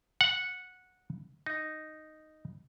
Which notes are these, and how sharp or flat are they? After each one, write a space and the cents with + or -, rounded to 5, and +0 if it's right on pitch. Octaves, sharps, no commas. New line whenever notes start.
F#5 -10
D#4 -5